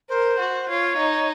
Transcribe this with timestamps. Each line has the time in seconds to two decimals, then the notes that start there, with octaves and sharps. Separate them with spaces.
0.09 A#4 C5
0.39 F#4
0.68 F4 C#5
0.97 D#4